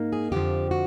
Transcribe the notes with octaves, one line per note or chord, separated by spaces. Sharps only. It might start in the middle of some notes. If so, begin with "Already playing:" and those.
Already playing: G#2 A#3 D#4
G#4
F2 D3 F3 G4
F#4